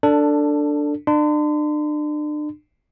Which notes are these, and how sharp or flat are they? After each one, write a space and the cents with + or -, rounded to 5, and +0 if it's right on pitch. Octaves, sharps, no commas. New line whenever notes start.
D4 +0 A4 +20
D4 +35 C6 -40